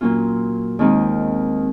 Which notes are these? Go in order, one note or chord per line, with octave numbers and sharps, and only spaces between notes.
A#2 F#3 A#3 C#4 F4
D#2 D#3 G#3 C4 D#4